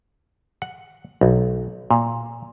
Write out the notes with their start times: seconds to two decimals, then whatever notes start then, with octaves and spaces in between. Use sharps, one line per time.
0.62 F#5
1.21 B1
1.91 A#2